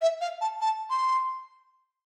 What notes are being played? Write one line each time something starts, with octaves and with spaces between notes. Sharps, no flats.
E5
F5
A5
A5
C6